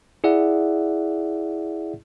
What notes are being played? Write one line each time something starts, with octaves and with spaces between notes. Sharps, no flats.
E4 G#4 D5 E5 F#5